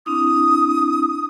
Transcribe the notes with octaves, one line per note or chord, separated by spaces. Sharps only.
C4 D4 E4 D#6